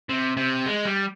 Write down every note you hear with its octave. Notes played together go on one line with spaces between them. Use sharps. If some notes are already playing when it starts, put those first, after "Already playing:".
C3
C3
G#3
G3